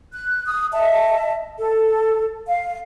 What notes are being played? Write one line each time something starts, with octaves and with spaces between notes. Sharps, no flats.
F#6
D#6
D#5 E5 A5
A4
F5